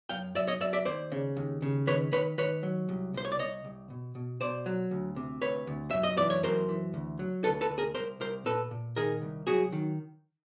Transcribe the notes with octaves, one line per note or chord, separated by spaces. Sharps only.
F#2 F5 G5
F#2 D5 E5
C#5 D#5
F#2 D5 E5
D5 E5
D#2 C5 D5
C#3
D#2
C#3
D#3 B4 C#5
D#3 B4 C#5
D#3 B4 C#5
F#3
C2
C2 C5
C#5
D5
C2 C#5 D#5
C2
B2
B2
B2 C5 D5
F#3
D2
C3
D2 B4 C#5
D2
F#2 E5
D#5
E3 D5
C#5
F#2 A#4 C5
E3
D2
F#3
D2 A4 B4
A4 B4
D2
G#4 A#4
C2 A#4 C5
C2 A#4 C5
A#2 A4 B4
A#2
D#3 G#4 A#4
C2
F#3 F#4 G#4
D#3